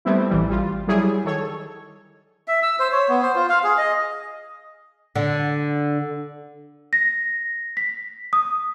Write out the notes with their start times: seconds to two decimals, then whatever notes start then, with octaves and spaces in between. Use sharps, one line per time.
0.05 G3 A3 B3 C4 E4
0.30 A1 E3 G3
0.50 G3 F4
0.87 F#3 G3 E4 G#4
1.25 D#3 A4 C#5
2.48 E5
2.63 E6
2.80 C5
2.92 C#5
3.09 B3
3.22 C5
3.35 F4
3.49 F5
3.64 G#4
3.78 D#5
5.16 D3
6.93 A#6
7.77 B6
8.33 D#6